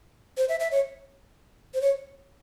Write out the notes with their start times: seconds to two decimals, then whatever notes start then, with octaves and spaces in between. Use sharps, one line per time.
0.37 C5
0.49 E5
0.60 E5
0.72 C#5
1.74 C5
1.81 C#5